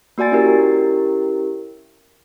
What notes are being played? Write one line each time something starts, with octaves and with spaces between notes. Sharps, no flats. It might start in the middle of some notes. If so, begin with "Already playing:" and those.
A#3 F#4 D5 G#5 A6
C#4 E4 G4 A#4